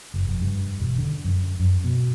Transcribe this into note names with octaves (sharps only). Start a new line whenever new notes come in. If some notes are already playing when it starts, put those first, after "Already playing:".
F#1
F1
G2
E1
D3
F#2
F#2
B2